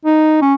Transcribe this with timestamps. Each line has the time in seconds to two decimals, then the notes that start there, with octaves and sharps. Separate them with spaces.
0.05 D#4
0.42 C#4